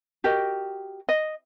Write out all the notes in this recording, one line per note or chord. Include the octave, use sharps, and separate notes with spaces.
F#4 G4 A#4 D#5
D#5